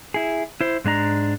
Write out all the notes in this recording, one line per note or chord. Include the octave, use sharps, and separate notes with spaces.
E4 G#4
E4 C5
G#2 G#3 D4 A#5